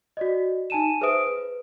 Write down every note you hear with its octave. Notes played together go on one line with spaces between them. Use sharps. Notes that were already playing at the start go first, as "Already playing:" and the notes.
F#4 D5 D#5
D#4 G#5 A5 D#7 E7
G#4 B4 C5 E5 D#6 D7
B4